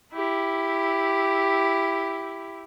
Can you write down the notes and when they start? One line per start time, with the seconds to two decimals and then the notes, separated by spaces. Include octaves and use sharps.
0.13 E4 G4